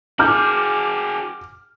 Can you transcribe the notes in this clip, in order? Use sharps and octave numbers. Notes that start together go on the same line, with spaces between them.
F#4 G#4 D6 F6 G6